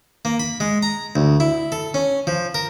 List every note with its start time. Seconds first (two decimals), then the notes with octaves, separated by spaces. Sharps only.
0.25 A#3
0.40 B5
0.60 G#3
0.82 A#5
1.16 D2
1.40 E4
1.72 A4
1.94 C#4
2.27 F3
2.54 A#4